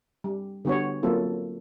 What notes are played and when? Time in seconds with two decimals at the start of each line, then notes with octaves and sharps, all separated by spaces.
0.24 G3
0.65 D3 G3 B3 F#4 C#5
1.03 F#3 A#3 C4 F4 A4